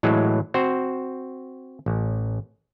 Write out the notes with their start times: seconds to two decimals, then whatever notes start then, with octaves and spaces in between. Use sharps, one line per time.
0.03 A2 E3 F#3 G#3
0.54 C4 F#4 C5
1.86 A1